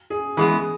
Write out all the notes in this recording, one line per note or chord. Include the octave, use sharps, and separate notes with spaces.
G#4
E3 G#3 B3 G#4